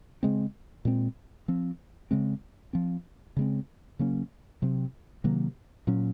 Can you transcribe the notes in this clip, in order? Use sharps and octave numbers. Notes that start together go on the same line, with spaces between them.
C#3 G#3 C4
A#2 G#3 C4
F3 C4
C#3 G#3 C4
F3 C4
C#3 G#3 C4
C#3 F#3 A#3 C#4
C3 F#3 C4
C3 D#3 F#3 A#3
A#2 F#3 C#4